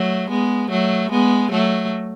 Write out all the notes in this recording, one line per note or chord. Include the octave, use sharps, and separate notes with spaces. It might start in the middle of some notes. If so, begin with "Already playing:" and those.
Already playing: F#3 A3
G#3 B3
F#3 A3
G#3 B3
F#3 A3